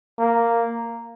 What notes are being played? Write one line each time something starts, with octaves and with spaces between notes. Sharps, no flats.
A#3